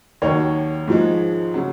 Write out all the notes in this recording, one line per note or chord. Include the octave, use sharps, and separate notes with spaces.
D#2 D#3 F#3 A#4 C#5
G#2 F3 G#3
C#3 F#3